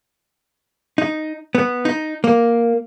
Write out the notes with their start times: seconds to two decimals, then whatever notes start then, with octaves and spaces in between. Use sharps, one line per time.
0.98 D#4
1.55 B3
1.85 D#4
2.24 A#3